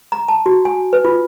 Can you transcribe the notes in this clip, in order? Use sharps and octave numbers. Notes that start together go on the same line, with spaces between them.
A#5
A5
F#4
G#5
B4
F4